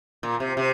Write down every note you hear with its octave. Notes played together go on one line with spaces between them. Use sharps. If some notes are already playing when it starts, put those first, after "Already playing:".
A#2
C3
C3